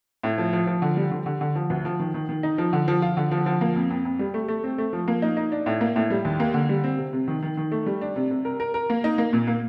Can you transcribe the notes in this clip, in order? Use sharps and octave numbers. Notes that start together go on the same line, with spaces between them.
A2
F3
F3
F3
D3
G3
D3
D3
D3
F3
D2
F3
D#3
D#3
D#3
D#4
F3
D3
F3
F4
D3
F3
F3
A#3
F2
F2
F2
G3
A3
A3
C4
A3
F3
A#3
D#4
D#4
D4
A2
A#3
A2
G3
D#2
A#3
D3
G3
C4
C3
C3
D#3
D#3
D#3
A3
G3
D4
C3
C3
A#4
A#4
A#4
A#3
D#4
A#3
A#2
A#3